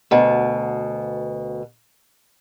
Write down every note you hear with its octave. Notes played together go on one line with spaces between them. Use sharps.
D2 B2